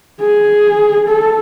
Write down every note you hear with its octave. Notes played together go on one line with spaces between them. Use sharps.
G#4
A4